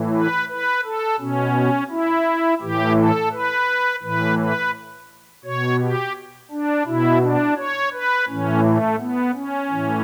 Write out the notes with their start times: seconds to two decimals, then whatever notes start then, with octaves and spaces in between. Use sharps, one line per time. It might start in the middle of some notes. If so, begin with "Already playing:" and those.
Already playing: A2 E3
0.14 B4
0.49 B4
0.84 A4
1.20 B2 C#4
1.90 E4
2.61 A2 E3 G4
2.97 A4
3.32 B4
4.03 A2 E3 B4
4.39 B4
5.44 B2 C#5
5.81 G4
6.51 D4
6.86 B2 E4
7.22 D4
7.57 C#5
7.93 B4
8.28 A2 E3 C#4
8.64 A3
8.99 B3
9.35 C#4
9.70 A2 E3